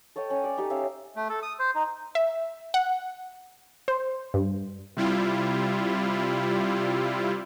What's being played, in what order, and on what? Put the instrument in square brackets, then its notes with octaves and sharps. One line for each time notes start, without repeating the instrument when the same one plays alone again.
[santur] A4 C#5 D#5 G5
C#4 G#5
C#5 D5
D#4 G4 A4
C#4 E5 F5
[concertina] A3
A4
D#6
C5
D#4
[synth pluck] E5
F#5
C5
G2
[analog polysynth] C3 G3 E4 F4